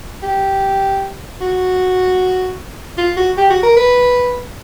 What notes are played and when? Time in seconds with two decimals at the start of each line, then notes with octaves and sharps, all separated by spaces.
0.23 G4
1.41 F#4
2.98 F4
3.17 F#4
3.37 G4
3.50 F#4
3.63 A#4
3.77 B4